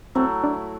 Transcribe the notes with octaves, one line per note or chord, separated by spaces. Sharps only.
F#3 A3 C4 E4
D4